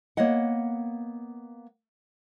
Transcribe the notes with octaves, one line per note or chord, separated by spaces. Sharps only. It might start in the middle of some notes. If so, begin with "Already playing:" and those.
A#3 B3 C#5 D#5 F#5